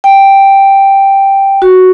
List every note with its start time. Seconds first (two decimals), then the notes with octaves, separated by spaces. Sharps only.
0.04 G5
1.62 F#4